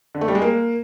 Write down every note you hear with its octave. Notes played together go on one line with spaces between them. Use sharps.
D3
A3
G3
G#3
A#3